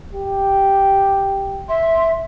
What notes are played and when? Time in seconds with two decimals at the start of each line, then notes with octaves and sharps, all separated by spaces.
0.13 G4
1.67 E5 C6